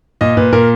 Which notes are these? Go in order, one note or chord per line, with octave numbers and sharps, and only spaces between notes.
A#2 D#5
A#2 B4
A#2 A#4